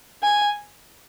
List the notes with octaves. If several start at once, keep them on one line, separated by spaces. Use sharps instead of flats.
G#5